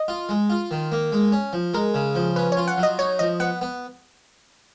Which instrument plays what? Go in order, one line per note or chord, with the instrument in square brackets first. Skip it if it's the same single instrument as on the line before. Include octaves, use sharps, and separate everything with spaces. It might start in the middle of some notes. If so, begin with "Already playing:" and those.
Already playing: [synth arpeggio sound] D#5
[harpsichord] F4
G#3
F4
D#3
A#3
G#3
C#4
F3
[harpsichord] G#3 [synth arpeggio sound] A#4
[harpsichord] C#3
F3
[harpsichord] C#4 [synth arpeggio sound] B4
[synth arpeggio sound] C#5
[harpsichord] F4
[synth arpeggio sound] F#5
[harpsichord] F#3
[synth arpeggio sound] D#5
[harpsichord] D#4 [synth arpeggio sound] C#5
[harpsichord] F3 [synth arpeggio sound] D#5
[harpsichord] B3 [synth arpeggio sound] F#5
[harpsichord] B3